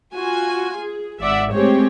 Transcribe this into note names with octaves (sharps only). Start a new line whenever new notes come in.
F4 F#4 G#5
G#4
G#1 D5 E5 F#5
G#3 A3 C4 G4 C#5